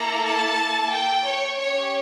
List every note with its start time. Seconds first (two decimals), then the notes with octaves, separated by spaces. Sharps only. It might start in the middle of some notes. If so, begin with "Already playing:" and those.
Already playing: A#3 E4 A4 A#5
0.26 A5
0.92 G5
1.24 C#5
1.57 C#4 G4 C#5